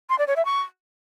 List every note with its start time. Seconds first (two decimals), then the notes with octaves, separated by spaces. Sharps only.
0.09 C6
0.18 D5
0.27 C#5
0.36 E5
0.45 C#6